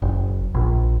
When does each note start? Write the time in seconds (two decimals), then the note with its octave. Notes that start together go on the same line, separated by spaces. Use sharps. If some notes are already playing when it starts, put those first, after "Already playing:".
0.02 F#1
0.55 A#1